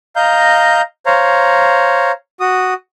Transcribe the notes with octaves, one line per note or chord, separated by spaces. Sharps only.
D#5 F5 A#5 G6
C5 C#5 F5 A#5
F#4 D#6